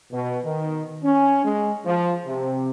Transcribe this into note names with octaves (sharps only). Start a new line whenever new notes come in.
B2
D#3
C#4
G#3
F3
C3